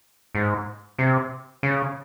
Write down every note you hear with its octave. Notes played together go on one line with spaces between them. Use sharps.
G#2
C3
C#3